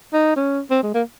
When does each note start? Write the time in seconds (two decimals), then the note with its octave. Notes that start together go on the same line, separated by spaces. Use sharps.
0.13 D#4
0.36 C#4
0.71 C4
0.83 G#3
0.94 A#3